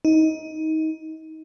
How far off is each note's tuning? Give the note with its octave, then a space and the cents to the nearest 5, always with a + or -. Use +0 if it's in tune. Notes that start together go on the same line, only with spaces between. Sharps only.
D#4 +20